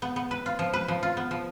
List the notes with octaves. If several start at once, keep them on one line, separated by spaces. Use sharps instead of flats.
B3
B3
B4
F4
F3
B4
F3
F4
B3
F3